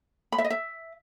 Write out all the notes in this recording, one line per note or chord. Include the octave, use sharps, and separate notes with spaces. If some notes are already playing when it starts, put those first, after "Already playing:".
B5
E5
D#5
E5